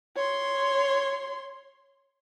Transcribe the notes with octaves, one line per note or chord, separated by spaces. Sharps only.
C#5 C6